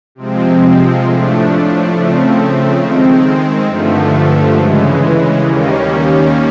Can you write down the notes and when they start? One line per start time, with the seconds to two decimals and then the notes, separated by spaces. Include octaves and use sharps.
0.15 C3 F3 G#3 C4
1.03 A2 F3 A3 D4
1.91 C#3 F3 A3 C4
2.78 D#3 G#3 C4
3.65 G2 D3 F3 A3
4.52 C#3 E3 G#3
5.40 D#2 D#3 G3 A#3 C#4